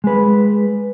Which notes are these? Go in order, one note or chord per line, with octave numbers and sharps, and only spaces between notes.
G#3 B4